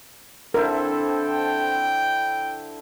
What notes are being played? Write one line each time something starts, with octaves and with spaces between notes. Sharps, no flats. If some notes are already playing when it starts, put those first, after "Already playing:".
D3 C4 E4 A4 A#4 C5
G5